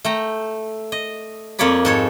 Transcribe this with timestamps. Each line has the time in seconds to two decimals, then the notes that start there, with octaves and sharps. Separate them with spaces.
0.04 A3 G5 A#5
0.92 D#5
1.59 F2 A#3 C#5 D5 B5
1.85 G#2 A4 C#5